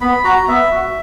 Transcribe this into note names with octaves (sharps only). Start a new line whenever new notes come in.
B3 B5
F#4 A#5
B3 E5
F#4